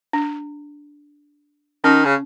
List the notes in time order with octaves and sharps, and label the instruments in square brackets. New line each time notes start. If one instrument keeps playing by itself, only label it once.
[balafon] D4
[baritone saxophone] D#3 [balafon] C#4
[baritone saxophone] C#3